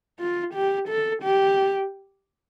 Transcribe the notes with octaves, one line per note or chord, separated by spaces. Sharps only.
F4
G4
A4
G4